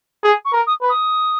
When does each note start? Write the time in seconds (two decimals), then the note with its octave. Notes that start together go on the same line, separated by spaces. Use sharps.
0.23 G#4
0.45 C#6
0.52 A#4
0.67 D#6
0.82 B4
0.89 D#6